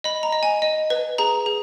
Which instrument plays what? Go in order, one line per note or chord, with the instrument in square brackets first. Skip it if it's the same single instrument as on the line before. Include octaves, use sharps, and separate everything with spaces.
[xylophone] D#5 B5
A#5
D#5
G#5
D#5
B4
G#4 A#5
G#4